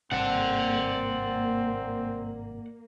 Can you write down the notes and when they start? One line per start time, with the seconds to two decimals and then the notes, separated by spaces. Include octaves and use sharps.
0.12 G#1 G2 C3 A#3 C4 D5 F#5